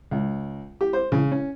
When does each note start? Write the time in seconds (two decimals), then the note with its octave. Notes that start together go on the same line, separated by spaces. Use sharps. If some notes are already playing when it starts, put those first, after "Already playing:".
0.11 C#2
0.81 G4
0.93 C5
1.12 C#3
1.32 C#4